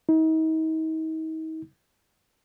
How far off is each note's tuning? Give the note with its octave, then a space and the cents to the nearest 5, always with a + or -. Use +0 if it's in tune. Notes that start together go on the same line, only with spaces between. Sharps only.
D#4 +40